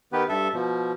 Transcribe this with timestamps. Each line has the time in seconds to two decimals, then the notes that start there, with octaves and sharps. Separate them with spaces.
0.12 D#3 B3 G4 B4
0.29 G2 A4 E5
0.54 B2 F3